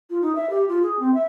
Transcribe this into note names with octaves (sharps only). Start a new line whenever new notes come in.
F4
D#4
E5
G4
F4
G#4
C4
E5